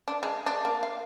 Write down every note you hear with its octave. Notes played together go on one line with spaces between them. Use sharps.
D4
G#3
D4
A#3
F5